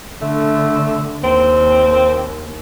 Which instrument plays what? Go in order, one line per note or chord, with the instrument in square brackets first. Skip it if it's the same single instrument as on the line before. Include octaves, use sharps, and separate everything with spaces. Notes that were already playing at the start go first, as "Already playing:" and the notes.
[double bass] D3 [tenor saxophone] A3
[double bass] D#2 A#3 [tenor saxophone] C4